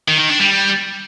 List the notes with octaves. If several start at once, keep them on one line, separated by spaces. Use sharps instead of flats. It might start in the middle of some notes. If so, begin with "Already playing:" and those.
D#3
D#3
D4
G3